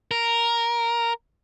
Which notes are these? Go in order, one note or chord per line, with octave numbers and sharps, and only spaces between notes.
A#4